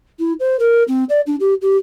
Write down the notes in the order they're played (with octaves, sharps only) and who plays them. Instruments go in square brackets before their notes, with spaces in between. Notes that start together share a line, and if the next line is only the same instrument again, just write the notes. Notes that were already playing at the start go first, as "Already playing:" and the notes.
[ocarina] E4
C5
A#4
C4
D5
D4
G4
G4